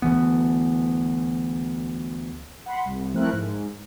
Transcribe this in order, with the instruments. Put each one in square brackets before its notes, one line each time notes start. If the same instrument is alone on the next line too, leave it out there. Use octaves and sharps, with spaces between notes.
[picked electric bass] D2 E3 B3
[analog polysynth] F#5 B5 C6
C2
F3 A3 C4 E4 A#4 F#6
G#2